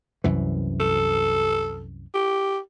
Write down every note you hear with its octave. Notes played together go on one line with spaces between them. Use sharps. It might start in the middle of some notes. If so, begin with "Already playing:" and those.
C2 F#2 E3
A4
G4